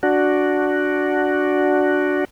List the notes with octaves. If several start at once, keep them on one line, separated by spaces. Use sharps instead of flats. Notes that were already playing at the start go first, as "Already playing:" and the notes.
D4 F#4